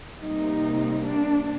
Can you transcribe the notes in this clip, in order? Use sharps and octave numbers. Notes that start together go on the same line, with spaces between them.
C3 G3 A#3 D#4
D4